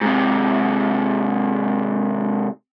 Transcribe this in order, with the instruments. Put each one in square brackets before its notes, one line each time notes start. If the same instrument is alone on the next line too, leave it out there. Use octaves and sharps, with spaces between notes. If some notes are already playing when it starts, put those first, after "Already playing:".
[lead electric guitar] G#2 C3